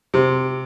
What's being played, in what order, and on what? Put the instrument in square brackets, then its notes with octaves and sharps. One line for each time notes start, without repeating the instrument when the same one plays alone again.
[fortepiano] C3